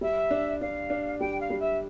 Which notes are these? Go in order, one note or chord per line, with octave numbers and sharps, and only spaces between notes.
G3 E5
D4
D4 F5
D4
G3 G5
F5
G3
E5